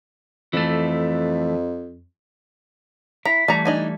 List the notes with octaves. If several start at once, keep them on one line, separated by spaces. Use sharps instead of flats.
F2 E3 A3
E4 A#5 B6
E3 G3 A3 D5 A5 A#5
D4 D#4 G#5